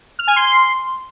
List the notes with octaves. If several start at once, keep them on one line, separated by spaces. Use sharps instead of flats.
F6
G#5
C6